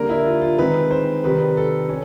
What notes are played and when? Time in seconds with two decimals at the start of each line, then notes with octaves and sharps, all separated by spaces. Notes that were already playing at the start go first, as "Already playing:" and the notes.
Already playing: D3 G3 A#3 D4 A#4
0.09 E4
0.26 F4
0.42 F4
0.58 D#3 G#3 C4 D#4 B4
0.91 C5
1.24 C3 D#3 G3 B4
1.57 A4
1.89 C#4